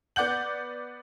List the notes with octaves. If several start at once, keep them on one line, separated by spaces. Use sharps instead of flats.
B3 D5 F#5 G6 F#7